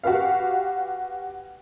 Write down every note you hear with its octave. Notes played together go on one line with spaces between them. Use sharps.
F#4 G4 B4 F5